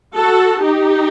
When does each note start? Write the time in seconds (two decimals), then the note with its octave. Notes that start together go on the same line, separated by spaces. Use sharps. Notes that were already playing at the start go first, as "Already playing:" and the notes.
0.17 F#4 A4
0.62 D#4 G4